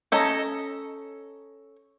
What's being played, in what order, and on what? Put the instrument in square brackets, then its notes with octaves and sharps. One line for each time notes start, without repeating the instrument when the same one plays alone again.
[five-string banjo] C#4 A4 D#5 A#5